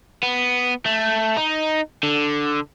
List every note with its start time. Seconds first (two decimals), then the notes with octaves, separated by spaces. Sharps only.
0.23 B3
0.86 A3
1.37 D#4
2.03 D3